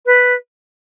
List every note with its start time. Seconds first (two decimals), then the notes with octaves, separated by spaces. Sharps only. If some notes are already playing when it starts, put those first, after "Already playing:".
0.05 B4